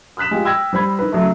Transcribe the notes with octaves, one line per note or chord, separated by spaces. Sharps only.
D#6 F6 F#6 B6 E7
G#3 F4 G4
G5 E6 F6 G#6 A#6
G3 C5 B5 G#6
D#3 B4
C#3 F#3 A3